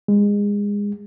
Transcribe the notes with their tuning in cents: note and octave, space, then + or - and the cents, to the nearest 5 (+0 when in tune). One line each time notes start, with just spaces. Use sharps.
G#3 -25